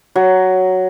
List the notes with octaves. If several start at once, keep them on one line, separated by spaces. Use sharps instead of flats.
F#3